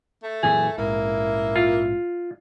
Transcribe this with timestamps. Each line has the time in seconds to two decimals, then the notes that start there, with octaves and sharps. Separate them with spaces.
0.23 A3
0.43 F#2 A#2 E3 G#4
0.78 A#1 G#2 A#3 E4
1.56 F4